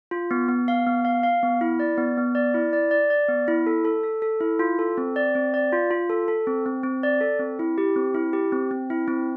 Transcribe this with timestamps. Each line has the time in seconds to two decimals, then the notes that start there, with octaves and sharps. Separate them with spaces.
0.11 F4
0.31 B3
0.49 B3
0.68 F5
0.86 B3
1.05 F5
1.23 F5
1.43 B3
1.61 E4
1.80 D5
1.98 B3
2.17 B3
2.35 D5
2.54 E4
2.73 D5
2.91 D5
3.10 D5
3.28 B3
3.48 E4
3.66 A4
3.85 A4
4.03 A4
4.22 A4
4.41 E4
4.59 F4
4.79 A4
4.98 C4
5.16 D5
5.35 C4
5.54 D5
5.72 F4
5.91 F4
6.10 A4
6.28 A4
6.47 C4
6.66 C4
6.83 C4
7.03 D5
7.21 A4
7.39 C4
7.59 E4
7.78 G4
7.96 C4
8.14 E4
8.33 G4
8.52 C4
8.71 C4
8.90 E4
9.08 C4